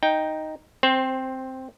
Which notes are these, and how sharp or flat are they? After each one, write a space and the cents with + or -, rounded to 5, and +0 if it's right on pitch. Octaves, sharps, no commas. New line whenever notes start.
D#4 +0 G5 +0
C4 +0 C5 +20